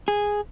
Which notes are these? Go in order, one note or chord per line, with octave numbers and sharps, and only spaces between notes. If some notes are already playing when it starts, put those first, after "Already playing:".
G#4